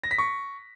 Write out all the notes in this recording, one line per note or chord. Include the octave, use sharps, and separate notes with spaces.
A#6
B6
C#6